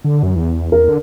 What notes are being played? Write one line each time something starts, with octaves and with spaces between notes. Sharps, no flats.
D3
F#2
E2
E2 A#4
D3